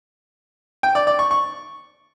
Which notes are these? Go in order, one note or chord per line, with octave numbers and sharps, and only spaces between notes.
G5
D5
D5
C#6
C#6